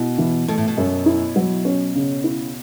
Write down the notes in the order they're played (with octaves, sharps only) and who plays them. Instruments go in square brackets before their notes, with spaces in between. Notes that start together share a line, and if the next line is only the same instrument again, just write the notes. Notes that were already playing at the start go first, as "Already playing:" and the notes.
Already playing: [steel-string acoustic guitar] B2 [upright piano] E4
[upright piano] E3
[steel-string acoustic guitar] B2 [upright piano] A3
[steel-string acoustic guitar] A2
B2
[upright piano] F#2
E4
F#3
C#4
C#3
E4